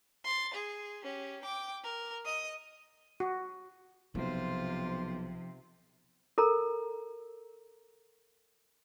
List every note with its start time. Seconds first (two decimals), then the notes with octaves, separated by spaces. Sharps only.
0.24 C6 A6
0.54 G#4
1.03 C#4 G4
1.42 G5 D6
1.84 A#4
2.25 D#5 D#6
3.20 F#4
4.15 B1 C3 F3 F4 C5
6.38 A4 A#4 A#5